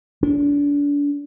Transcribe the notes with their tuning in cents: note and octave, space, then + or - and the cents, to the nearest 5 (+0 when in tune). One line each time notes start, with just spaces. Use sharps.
D4 -35